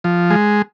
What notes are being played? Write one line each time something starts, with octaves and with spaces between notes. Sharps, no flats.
F3
G#3